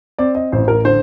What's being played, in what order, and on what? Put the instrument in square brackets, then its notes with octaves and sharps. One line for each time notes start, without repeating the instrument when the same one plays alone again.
[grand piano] C4 D5
D#5
A1 C5
A#4
D3 C5